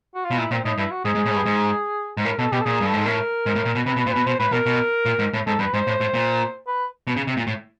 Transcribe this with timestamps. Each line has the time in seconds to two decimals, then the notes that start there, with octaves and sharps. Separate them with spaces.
0.15 F#4
0.25 F4
0.31 B2
0.38 A#2 E4
0.51 A#2 C4
0.65 A2 D#4
0.78 G2 E4
0.91 F#4
1.05 G#2 G#4
1.15 G#2
1.26 A2
1.30 G#2
1.35 G2
1.46 G#2
2.17 G#2
2.25 A2 A#4
2.38 B2 A4
2.52 B2 G4
2.61 A4
2.65 A#2 G#4
2.81 G2
2.86 A4
2.93 G#2
3.06 A2 A#4
3.46 G#2
3.55 A2
3.65 A#2
3.75 B2
3.86 C3 B4
3.96 B2
4.00 B4
4.06 A#2 C5
4.12 B2 B4
4.26 B2 C5
4.39 A2 B4
4.52 B2 A#4
4.66 B2
5.06 A#2
5.19 G#2
5.34 A2
5.47 G#2 A4
5.59 G2 B4
5.74 G#2 C5
5.87 A2
6.00 A2
6.14 A#2
6.67 B4
7.07 B2
7.16 C#3
7.27 C3
7.37 A#2
7.47 A2